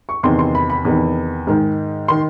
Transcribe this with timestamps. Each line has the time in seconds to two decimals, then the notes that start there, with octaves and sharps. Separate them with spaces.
0.09 C#6
0.23 E2 C3 D#3 C6
0.39 C6
0.55 B5
0.70 B5
0.85 E2 C3 D#3
1.47 G#2 D#3
2.08 D#3 C6